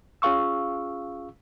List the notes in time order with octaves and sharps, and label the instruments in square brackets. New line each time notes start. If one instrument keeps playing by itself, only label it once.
[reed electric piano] C#4 F4 G#4 F5 C#6 E6